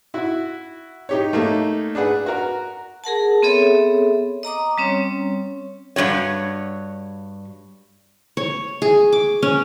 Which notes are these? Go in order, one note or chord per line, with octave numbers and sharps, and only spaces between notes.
E4 F#4
D#4 G4 C#5
A3 A#3 D#4
D4 G#4 B4 F#5
F#4 A#4
G#4 A#4 F#5 A5
B3 C4 G#4 A4 C#5 E5
D#5 A#5 D6 D#6
G3 C4 C#4 C#5
G2 F3 F#4 C#5
C#5
G#4
D6
C#4